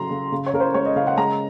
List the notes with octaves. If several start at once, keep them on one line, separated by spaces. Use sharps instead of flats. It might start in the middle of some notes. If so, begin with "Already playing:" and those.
Already playing: C#3 F#3 A#5 C6
C#3
C#3
C#5
C#3 A#4
C5
G#3 C#5
D#5
C#3 F5
F#5
G#3 A#5